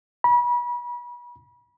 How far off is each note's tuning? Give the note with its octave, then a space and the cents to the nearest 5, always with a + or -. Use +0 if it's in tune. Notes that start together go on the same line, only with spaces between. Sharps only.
B5 -35